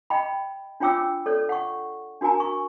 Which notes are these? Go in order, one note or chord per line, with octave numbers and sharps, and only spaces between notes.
D#5 G5 B5
D4 F4 C#5 G5 D6 E6
A4 C#5 D5
F#5 C#6
D4 F#4 A#4 G#5 A#5
C#6